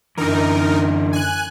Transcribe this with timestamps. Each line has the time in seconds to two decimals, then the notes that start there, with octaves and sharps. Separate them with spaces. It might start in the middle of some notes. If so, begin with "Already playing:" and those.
0.17 F#2 D3 E3 D#4 A#4
1.13 G#5 F#6